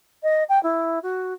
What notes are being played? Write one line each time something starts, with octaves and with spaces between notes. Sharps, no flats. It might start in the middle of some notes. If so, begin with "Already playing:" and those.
D#5
G5
E4
F#4